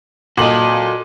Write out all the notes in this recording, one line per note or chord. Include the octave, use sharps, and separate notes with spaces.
A#2 F#4 A4 D#5 F#7